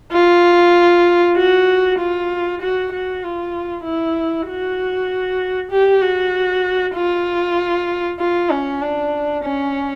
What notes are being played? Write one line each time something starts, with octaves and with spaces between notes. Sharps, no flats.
F4
F#4
F4
F#4
F#4
F4
E4
F#4
G4
F#4
F4
F4
C#4
D4
C#4